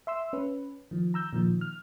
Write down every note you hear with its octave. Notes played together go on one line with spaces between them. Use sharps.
E5 C6 E6
C#4 B4
D#3 F3
A#5 E6 G6
A#2 D#3 F3
F6